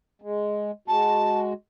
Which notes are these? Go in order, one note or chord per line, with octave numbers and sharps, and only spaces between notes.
G#3
G#3 F#4 A5